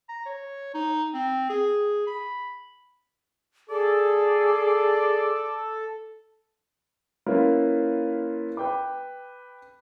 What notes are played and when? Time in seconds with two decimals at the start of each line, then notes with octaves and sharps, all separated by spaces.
0.09 A#5
0.26 C#5
0.74 D#4
1.14 C4
1.50 G#4
2.07 B5
3.70 G#4 A4 D5
7.26 A#3 C#4 E4 F4 B4
8.57 B4 G5 D6